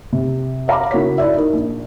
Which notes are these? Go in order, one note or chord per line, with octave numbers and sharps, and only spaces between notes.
C3
E5 F5 A#5 B5 D6
C#3 A#3 E4 F#4 C#5 B6
E4 F#4 D5 E5
D#4 A#4
A#1